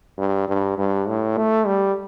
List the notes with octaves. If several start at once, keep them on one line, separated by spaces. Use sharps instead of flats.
G2
G2
G2
A2
A3
G3